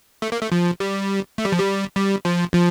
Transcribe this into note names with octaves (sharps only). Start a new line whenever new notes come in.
A3
A#3
A3
F3
G3
A3
G3
F3
G3
G3
F3
F3